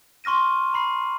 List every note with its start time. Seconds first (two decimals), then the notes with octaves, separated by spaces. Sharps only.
0.24 C6 C#6 F6 A#6 D#7
0.73 A#5 B5 C7